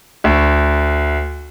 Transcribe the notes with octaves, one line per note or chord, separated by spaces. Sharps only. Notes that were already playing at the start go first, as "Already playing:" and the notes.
D2